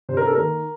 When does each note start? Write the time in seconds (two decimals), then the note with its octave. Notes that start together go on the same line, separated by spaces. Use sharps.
0.09 C3 C5
0.17 A#4
0.26 A4
0.35 D#3 A#3 A#4